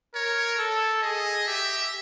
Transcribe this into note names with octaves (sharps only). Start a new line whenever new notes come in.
A#4 C#5
A4
G#4 D#5
G4 E5